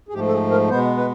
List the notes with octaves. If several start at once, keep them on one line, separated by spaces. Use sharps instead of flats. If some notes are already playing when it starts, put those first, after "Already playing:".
G#4
G#2 F3 A3 G4
A4
G#4
A#4
B2 G#3 B3 C5
B4